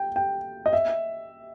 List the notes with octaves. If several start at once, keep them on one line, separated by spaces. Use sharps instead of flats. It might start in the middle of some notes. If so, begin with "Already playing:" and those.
Already playing: G5
G5
D#5
E5